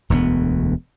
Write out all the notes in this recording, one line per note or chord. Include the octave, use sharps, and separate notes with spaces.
E1 D2 A#3 B3